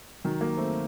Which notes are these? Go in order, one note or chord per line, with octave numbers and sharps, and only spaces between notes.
D#3 F#3
F#3 A#3
A3 C4